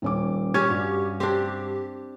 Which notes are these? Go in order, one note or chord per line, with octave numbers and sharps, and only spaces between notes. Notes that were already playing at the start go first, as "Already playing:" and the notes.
D#1 C#4 D6
C#4 G4 G#6
G2 F#4
C4 D4 G4